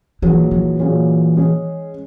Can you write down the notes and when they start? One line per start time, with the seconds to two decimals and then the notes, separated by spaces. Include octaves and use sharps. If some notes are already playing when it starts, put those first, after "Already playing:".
0.22 A#2 E3 F#3 A#3 C#4 G#4
0.51 E3
0.79 A#2 F#3 A#3 C#4 G#4
1.36 G#3 C#4 G#4